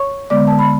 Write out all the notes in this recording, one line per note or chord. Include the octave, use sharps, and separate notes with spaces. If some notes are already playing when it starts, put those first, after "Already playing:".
Already playing: C#5 C#6
D3 G#3 B3 D5 D6
A5
B5